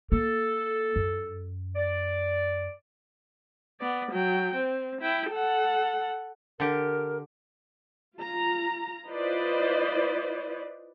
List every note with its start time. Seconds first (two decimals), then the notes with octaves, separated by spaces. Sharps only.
0.12 A#3 A4
0.96 F#2
1.75 D5
3.80 B3 D5
4.11 F#3 G5
4.55 C4
5.01 E4 G5
5.31 A4 F#5
6.60 D3 G4 A#4
8.17 F4 A#5
9.08 E4 F4 B4 C5 D5 D#5